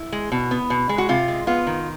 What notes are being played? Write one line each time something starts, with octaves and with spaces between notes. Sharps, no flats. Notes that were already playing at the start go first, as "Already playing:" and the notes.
Already playing: E4
G#3
B2
B3
B2
G#3
F#4
C3 F4
G#3
B3 F4
D#3